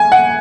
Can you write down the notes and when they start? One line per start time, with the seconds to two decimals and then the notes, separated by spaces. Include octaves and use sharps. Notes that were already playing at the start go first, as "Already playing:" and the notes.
Already playing: G#5
0.12 F#5